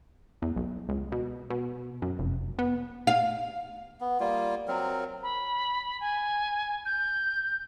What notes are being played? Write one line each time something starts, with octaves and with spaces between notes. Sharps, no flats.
E2
B1
C#2
B2
B2
F#2
F1
B3
F5
B3
G3 A#3 F4
F#3 C4 A#4
B5
G#5
G6